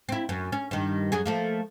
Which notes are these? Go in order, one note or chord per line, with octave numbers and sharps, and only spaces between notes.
C4 E4
F#2
C#4
G2 D#3
F#2 F#3 G#4
F3 A3 A#3